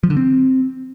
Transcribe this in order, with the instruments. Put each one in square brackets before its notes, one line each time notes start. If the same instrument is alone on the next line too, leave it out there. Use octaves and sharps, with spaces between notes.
[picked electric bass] F3
D3
C4